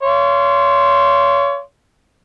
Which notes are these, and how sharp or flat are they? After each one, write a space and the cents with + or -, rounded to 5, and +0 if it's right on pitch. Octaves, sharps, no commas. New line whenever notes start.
C#5 +30 F5 -35 C6 +0